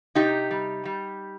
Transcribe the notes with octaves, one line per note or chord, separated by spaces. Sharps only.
C3 D#4 G4
G3
G3